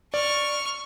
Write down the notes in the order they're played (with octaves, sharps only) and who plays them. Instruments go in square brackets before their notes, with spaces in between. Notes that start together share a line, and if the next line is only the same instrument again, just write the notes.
[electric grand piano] D5 [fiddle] C#6 F6